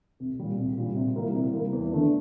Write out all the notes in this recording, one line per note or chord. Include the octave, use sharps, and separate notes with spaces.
C2
A#2 G3
C2
A#2 G3
C3
G3 A#3 E4
C3
G3 A#3 E4
E2
D3 A3 D4